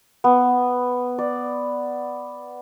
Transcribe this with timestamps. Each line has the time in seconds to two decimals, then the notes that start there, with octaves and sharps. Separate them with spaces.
0.24 B3
1.18 D5